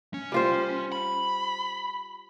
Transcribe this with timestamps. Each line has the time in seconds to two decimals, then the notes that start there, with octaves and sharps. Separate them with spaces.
0.14 C#4
0.32 G3 F4 C5
0.92 B5